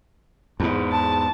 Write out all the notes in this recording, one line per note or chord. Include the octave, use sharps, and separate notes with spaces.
E2 G#2
A5